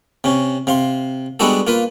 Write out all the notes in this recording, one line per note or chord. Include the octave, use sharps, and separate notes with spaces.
C3 C#4
C3 F5 C6
G3 G#3 B3 D4 F#4 A4
A#3 F4 B4